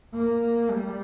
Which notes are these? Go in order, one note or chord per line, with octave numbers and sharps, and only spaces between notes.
A#3
G3